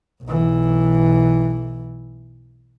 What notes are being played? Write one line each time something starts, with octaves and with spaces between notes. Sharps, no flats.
B1 E3